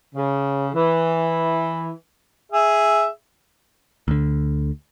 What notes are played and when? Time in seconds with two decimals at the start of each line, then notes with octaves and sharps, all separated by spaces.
0.15 C#3
0.73 E3
2.52 G#4 E5
4.08 D2 D3